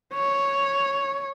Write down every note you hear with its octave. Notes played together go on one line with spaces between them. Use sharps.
C#5